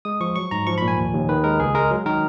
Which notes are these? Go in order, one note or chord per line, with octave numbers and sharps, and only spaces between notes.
G#3 D#6
F3 C#6
F#3 C#6
G#2 A#5
F3 C#6
B5
A#2
G#5
D#2
D#2
D#3 B4
G#3 A#4
C#2 G#4
G#3 A#4
F#3
D#3 A#4